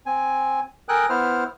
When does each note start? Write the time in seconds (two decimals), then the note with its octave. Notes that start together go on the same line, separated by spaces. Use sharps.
0.06 C4 G#5
0.89 A4 A#4 G5 G#5 D#6 F#6
1.10 B3 E4 C5 F6